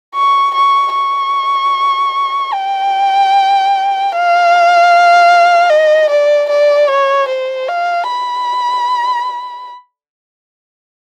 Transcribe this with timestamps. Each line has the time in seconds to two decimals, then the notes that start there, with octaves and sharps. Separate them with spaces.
0.15 C#6
0.55 C#6
0.95 C#6
2.53 G5
4.12 F5
5.69 D#5
6.10 D5
6.50 D5
6.89 C#5
7.29 C5
7.68 F5
8.08 B5